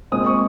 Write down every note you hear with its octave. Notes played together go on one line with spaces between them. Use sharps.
A#2 G#3 C4 D#6
C#6